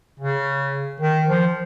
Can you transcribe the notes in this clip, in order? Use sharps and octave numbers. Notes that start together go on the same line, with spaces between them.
C#3
D#3
F3